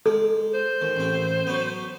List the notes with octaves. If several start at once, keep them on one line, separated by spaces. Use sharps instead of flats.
G#3 A4
C5
D#2
A1 C4
F#3 B3